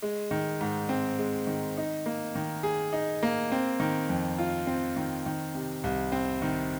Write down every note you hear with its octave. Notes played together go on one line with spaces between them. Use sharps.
G#3
D#3
G#2
C4
G#3
D#3
D#4
A#3
D#3
G#4
D#4
A#3
C4
D#3
F2
F4
C4
D#3
D#3
C3
C2
C4
D#3